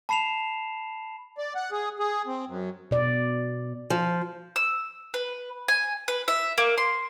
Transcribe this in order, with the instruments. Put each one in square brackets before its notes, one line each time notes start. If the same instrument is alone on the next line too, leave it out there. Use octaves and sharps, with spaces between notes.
[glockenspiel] A5 B5 C7 E7 F7
[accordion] D5
F#5
G#4
G#4
C4
F#2
[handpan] B2 D5
[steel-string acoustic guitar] F3
[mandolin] E6
B4
G#5
B4
E5
A#3
C6